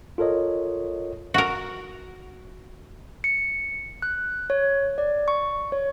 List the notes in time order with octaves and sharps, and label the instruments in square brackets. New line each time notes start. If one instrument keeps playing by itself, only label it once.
[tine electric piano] F4 A4 A#4 C#5 D#5
[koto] F#4 A#4
[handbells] C#7
F#6
C#5
D5
C#6
C#5